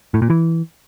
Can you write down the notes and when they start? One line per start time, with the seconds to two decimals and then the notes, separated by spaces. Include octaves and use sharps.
0.14 A2
0.22 A#2
0.30 E3